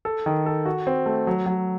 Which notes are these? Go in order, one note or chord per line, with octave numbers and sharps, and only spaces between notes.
A4
D#3
A4
F#4
C4
A3
F#3
F#3